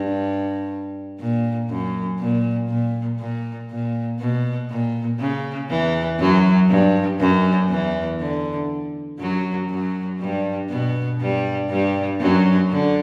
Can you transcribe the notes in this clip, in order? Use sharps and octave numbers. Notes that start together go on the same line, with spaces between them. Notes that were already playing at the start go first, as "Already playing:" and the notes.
Already playing: G2
A#2
F#2
A#2
A#2
A#2
A#2
B2
A#2
C#3
E2 E3
F#2 F#3
G2
F#2
E2 E3
D3
F#2 F#3
F#2 F#3
G2 G3
B2 B3
G2 G3
G2 G3
F#2 F#3
D3